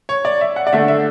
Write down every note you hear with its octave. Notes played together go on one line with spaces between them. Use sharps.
C#5
D5
E5
F#5
D5
D3 A3 D4 E5
E5